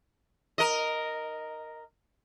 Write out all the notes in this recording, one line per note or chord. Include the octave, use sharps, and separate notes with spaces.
A#4 D#5